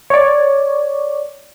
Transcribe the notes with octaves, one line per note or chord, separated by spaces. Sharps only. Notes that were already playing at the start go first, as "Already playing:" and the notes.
C#5 D5